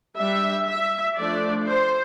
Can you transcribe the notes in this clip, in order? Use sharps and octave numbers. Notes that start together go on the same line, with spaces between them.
G3 D4 E5
E5
F3 A3 D4 D5
C5